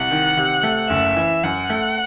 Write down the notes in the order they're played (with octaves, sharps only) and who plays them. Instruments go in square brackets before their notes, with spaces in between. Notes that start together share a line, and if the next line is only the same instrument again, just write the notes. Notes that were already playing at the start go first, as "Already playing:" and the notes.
Already playing: [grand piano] C2 [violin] F#5
[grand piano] D#3
C3
A3
[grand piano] F#1 [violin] E5
[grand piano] E3
[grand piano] F#2 [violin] F#5
[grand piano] A3